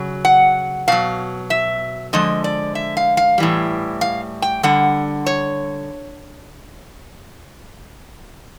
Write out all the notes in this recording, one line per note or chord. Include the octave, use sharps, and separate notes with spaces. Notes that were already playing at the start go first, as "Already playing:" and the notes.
Already playing: C#3 F#3
F#5
B2 F#3 F5
E5
D3 F3 G#3 D#5
D5
E5
F5
F5
A2 E3 G3
F5
G5
D3 G3 F#5
C#5